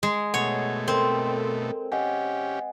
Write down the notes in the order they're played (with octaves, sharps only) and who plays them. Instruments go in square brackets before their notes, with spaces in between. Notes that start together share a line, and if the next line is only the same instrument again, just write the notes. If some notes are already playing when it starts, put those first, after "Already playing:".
[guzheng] G#3
[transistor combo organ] B2 A3 [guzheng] C#5 [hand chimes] F#5
[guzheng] C4 [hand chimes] A4 A#4
[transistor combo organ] C#4 G4 [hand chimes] D#5 F#5 G#5